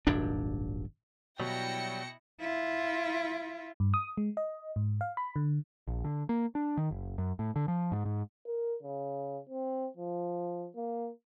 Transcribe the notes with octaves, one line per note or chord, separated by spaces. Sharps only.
D#1 G#1 F#2 D4
B2 F#3 G3 E4 G5 A#6 C#7
E4 F4
G2
D#6
G#3
D#5
G#2
F5
B5
D3
A#1
D3
A#3
D4
D#3
F#1
F#2
A2
D3
F3
G#2
G#2
A#4
C#3
C4
F3
A#3